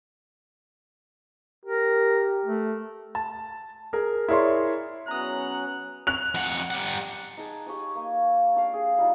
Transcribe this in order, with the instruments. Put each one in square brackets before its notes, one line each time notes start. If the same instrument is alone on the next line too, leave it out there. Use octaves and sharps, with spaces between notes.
[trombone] G4 [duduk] A#4
[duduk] A3
[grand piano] A5
G#4 A#4
E4 G#4 A#4 C#5 D5 C6
[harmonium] F#3 B3 C#4 [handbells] A#5 D#6 [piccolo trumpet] F#6
[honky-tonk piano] F#6 F7
[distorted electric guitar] F2 F#5
G3 F#5
[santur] D#4 G#4 A5
G4 C#5 D#5 G#5
A#3
D4 D5 F5
G#4
G3 D#4 F4